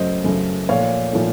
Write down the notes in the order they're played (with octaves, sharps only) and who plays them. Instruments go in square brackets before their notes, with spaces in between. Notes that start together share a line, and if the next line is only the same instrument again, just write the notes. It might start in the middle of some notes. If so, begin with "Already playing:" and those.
Already playing: [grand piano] F#2 C#3 F#3 A3 C5 D#5
F#2 C#3 F#3 A3
A#2 F3 A3 C#5 F5
A#2 F3 A3